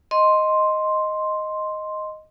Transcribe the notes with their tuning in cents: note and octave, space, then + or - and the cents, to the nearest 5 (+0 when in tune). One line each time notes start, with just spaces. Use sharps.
D#5 +0 C6 +0